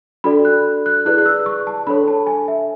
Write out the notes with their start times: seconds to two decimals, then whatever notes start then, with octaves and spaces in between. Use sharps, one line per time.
0.24 D4 F#4 A4 D5 B5
0.45 F#6
0.86 F#6
1.05 E4 G#4 B4 D5 F#6
1.18 F#6
1.26 E6
1.46 C#6
1.67 A5
1.87 D4 A4 C#5 B5
2.07 A5
2.27 G#5
2.48 E5